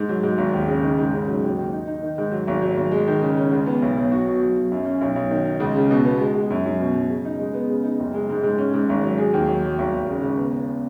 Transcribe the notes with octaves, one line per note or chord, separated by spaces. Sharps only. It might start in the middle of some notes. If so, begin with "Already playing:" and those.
Already playing: G#2
F#3
G#2
G#1
D#2
C#3
D#3
G#2
C#3
F#3
D#2
D#2
D#4
D#4
D#3
G#2
F#3
G#1
F#3
G#1
G#3
D#3
C#3
C#4
C#2
B3
B1
B1
F#4
B2
F#3
F#3
F#2
C#4
B1
B1
D#3
D#4
C#2
C#3
B2
B3
G#3
G#3
F#2
F#2
B2
F#3
C#3
D#4
G#3
B3
C#3
D#4
F#1
G#3
G#2
G#2
C#4
G#2
G#1
F#3
G#4
D#2
F#3
F#3
G#1
G#1
C#3
C#2
B3
B3